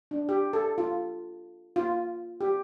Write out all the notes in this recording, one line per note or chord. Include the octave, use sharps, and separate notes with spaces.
D4
G4
A4
F4
F4
G4